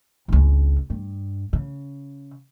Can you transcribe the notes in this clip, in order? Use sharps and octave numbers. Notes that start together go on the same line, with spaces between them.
G1 C#2
G2
C#3